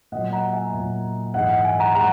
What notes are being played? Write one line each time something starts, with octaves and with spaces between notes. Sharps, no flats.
A#2 F#3 A#3 D#5 F#5
F#5 A#5
E5 G#5
A#2 F#3 A#3
G#2 E3 G#3 D#5 F#5
D#5 F#5
E5 G#5
F#5 A#5
E3 G#3 F#5 A#5